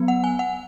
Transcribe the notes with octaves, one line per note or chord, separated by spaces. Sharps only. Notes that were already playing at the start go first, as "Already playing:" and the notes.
Already playing: F#3 B3
F#5
G#5
F#5